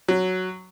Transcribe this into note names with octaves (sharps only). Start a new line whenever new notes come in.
F#3